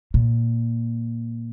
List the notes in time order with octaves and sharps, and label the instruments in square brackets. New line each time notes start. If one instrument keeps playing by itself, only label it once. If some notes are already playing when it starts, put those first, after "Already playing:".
[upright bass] A#2